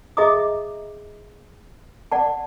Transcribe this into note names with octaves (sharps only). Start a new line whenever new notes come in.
G#4 D#5 E5 A#5 D6 D#6
D5 F#5 A5